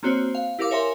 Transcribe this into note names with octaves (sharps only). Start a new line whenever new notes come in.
A#3 C4 F#4 C5 C#5
F5
E4 G4 A#4 F5 D6
A#4 C#5 E5 G#5 C6